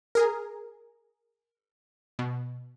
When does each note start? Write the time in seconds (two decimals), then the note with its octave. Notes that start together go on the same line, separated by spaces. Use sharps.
0.15 G#4 A#4
2.19 B2